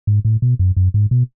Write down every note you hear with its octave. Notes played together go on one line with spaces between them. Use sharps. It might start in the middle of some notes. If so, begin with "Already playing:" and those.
G#2
A2
B2
F#2
F#2
G#2
B2